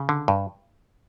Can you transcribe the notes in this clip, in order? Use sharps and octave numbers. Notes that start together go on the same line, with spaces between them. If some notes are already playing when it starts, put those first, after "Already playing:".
Already playing: C#3
D3
G2